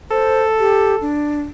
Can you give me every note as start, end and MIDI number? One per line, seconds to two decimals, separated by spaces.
0.11 1.08 69
0.11 0.42 72
0.60 0.96 67
1.01 1.43 62